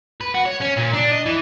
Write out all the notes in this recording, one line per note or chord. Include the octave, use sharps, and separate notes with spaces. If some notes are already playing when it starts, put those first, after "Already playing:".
B4
F#4
C#5
C#4
A#2
D4
D#5
E3